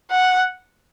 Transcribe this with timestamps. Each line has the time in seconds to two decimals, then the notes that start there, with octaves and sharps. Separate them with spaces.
0.11 F#5